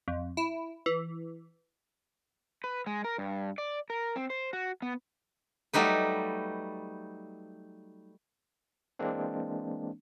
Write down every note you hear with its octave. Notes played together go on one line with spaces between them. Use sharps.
F2
E4
E3
B4
G#3
A#4
G2
D5
A#4
C4
C5
F#4
B3
F#3 G3 A3 D#4 B4
E3 G#3 A#3 C4 D4